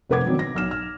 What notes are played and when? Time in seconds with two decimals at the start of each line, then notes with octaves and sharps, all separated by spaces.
0.09 F1 C3 B4 F#5 D6 G#6
0.26 B2 D#3 F#3 B3 C4 D4
0.39 A#6
0.55 B1 F6 E7
0.71 F6